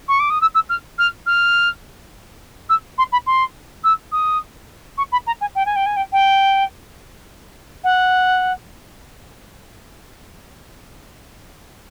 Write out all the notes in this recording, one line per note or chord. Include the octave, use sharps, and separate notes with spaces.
C#6
D6
D#6
E6
E6
F6
F6
F6
E6
C6
B5
C6
E6
D#6
C#6
B5
A#5
G#5
G5
G#5
G5
G#5
G5
G5
F#5